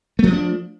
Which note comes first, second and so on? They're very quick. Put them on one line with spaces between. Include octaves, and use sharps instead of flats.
A3 F3 C#4 D4